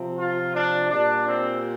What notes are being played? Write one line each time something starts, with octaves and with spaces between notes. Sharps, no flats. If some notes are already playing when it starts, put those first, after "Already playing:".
Already playing: C3 F3
F4
D4
A#2 G3 D4
C4